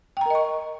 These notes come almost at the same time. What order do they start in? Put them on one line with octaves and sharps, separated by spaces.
G5 A#5 A#4 D#5 C#6